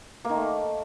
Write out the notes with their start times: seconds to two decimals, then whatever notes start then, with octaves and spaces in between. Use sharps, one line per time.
0.25 A#3
0.30 D#3
0.35 A3